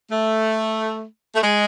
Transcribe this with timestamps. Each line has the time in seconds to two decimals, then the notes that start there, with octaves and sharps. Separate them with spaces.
0.11 A3
1.35 A3
1.43 G#3